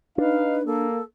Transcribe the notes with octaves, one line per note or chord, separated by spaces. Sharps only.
D4 D#4 B4 F5
A#3 A4